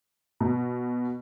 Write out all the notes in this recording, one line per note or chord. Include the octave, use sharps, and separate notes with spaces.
B2